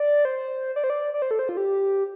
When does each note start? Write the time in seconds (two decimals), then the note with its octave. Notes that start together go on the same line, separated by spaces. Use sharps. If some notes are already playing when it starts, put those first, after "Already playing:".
Already playing: D5
0.25 C5
0.76 D5
0.84 C5
0.90 D5
1.14 D5
1.22 C5
1.31 A4
1.39 C5
1.49 F4
1.57 G4